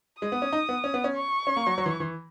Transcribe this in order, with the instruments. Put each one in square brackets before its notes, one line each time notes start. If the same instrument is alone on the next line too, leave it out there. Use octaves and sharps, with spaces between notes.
[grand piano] G#3 [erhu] D#6
[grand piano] B3
C#4
D#4
B3
C#4
B3
C#4
[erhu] C#6
[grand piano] C#4
A#3
F#3
F#3
E3
E3